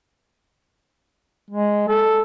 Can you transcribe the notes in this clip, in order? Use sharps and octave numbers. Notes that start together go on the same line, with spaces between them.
G#3
A4